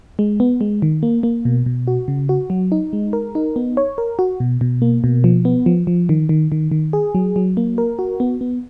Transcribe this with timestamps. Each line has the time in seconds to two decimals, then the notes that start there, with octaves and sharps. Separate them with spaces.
0.19 G#3
0.40 B3
0.61 G#3
0.82 D#3
1.03 A#3
1.23 A#3
1.45 B2
1.66 B2
1.88 F#4
2.08 C#3
2.29 F#4
2.50 F#3
2.72 D#4
2.93 G#3
3.13 A#4
3.35 D#4
3.56 B3
3.77 C#5
3.98 A#4
4.19 F#4
4.40 B2
4.61 B2
4.82 A#3
5.04 B2
5.24 F3
5.45 B3
5.66 F3
5.87 F3
6.09 D#3
6.29 D#3
6.52 D#3
6.72 D#3
6.93 G#4
7.15 F#3
7.36 F#3
7.57 A#3
7.78 A#4
7.99 F#4
8.20 B3
8.41 B3